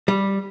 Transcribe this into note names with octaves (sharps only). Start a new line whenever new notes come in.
G3